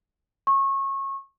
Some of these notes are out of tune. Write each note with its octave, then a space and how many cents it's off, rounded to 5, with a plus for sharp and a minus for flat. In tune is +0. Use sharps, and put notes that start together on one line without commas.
C#6 -25